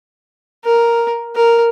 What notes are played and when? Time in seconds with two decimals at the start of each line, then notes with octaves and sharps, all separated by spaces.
0.65 A#4
1.36 A#4